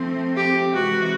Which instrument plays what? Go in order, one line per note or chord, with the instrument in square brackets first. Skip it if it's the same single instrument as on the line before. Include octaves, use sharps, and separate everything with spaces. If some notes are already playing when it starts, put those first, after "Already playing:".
Already playing: [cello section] F3 A3 C4
[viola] G4
[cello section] C3 E3 G#3 [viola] F#4